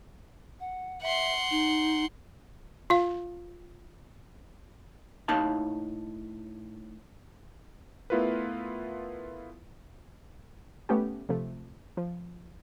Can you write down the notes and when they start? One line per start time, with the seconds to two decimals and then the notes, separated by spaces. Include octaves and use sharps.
0.60 F#5
1.02 E5 F#5 C6
1.51 D#4
2.90 F4 F5
5.28 A2 A#3 D#4 F5 A5
8.10 A3 B3 E4 F4 A#4 B4
10.89 A3 B3 C#4 G4
11.29 C3 F3 A3
11.97 F3